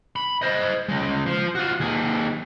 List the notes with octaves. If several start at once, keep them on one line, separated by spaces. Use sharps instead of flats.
B5
C5 D#5
C#3 G#3
F3 C5
F4 F#4
D#2 G#4